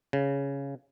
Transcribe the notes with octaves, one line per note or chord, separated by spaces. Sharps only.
C#3